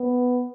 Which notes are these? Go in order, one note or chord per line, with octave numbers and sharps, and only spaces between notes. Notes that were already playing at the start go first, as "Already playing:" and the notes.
Already playing: B3